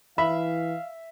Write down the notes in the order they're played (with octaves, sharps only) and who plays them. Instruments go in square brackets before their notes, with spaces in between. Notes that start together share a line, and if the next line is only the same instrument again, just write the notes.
[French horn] E3 [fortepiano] E5 [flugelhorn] F5 [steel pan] B5